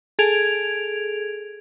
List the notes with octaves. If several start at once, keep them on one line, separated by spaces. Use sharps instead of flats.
G#4 A4 G#6 D7 F7